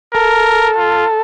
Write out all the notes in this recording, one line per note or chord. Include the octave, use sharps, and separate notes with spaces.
A4 A#4
F4